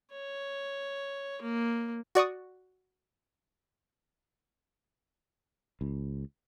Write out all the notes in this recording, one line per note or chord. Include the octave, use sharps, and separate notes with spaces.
C#5
A#3
F#4 D5 C#6 D#6
C#2